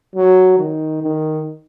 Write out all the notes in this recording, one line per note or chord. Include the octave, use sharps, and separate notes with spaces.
F#3
D#3
D#3